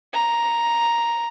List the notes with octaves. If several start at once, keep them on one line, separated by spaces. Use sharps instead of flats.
A#5